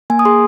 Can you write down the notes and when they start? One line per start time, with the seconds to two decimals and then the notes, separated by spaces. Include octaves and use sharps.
0.10 A#3 G#5
0.19 D#6
0.25 G#4 C6